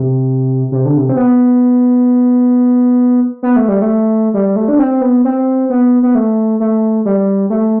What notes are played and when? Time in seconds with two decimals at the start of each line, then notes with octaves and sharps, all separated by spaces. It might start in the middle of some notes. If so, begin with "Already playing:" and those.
Already playing: C3
0.72 C3
0.85 D3
0.97 C3
1.09 C4
1.17 B3
3.43 B3
3.56 A3
3.68 G3
3.82 A3
4.34 G3
4.56 A3
4.68 D4
4.79 C4
5.01 B3
5.25 C4
5.70 B3
6.03 B3
6.15 A3
6.60 A3
7.05 G3
7.50 A3